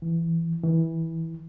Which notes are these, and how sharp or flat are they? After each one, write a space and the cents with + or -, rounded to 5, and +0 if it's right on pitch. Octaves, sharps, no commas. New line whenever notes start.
E3 +10
E3 -15